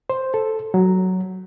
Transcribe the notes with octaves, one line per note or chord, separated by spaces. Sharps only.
C5
A4
F#3